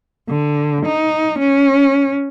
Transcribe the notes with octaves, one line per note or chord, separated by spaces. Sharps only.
D3
D#4
C#4